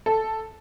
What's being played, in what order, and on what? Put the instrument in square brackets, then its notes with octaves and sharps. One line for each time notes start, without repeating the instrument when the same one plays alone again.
[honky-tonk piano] A4